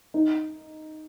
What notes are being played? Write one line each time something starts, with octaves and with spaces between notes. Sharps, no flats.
D#4